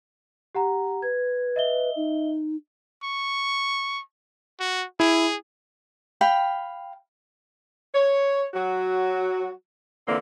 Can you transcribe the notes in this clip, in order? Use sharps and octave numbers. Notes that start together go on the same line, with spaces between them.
G4 F#5 A#5
B4 G#6
D#5 E5 G7
D#4
C#6
F#4
E4 G#4
F5 G5 B5
C#5
F#3 F#4
A#2 D3 E3 A#3 C4